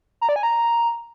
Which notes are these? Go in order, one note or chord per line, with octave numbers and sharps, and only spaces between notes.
A#5
D5
G#5
A#5